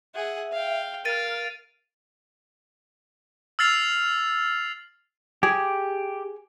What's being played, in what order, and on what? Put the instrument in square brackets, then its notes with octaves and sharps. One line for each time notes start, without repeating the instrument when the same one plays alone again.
[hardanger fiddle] G#4 F#5 [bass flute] E5
[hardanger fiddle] F5 G5
[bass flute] A#4 [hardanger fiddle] F5 [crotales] A6 D7 D#7
[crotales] E6 F6 A6 C7 F7
[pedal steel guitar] G4 [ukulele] G#4